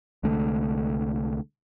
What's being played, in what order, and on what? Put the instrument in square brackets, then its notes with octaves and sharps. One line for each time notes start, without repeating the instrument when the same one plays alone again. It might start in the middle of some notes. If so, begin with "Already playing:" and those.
[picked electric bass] C2 D3 G#3 A3